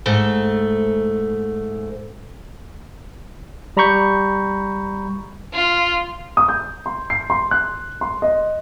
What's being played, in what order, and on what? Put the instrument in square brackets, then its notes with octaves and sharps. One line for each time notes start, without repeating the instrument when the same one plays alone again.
[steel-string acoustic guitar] G#2 A3 A4
[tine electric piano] G3 A#5 B5 C#6 G6
[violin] F4
[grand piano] D#6
G6
C6
C7
C6
F#6
C6
D#5